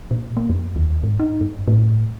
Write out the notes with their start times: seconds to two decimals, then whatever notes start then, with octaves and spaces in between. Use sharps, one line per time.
0.11 A#2
0.37 A#3
0.50 F2
0.76 D#2
1.03 G#2
1.20 D#4
1.41 G2
1.68 A2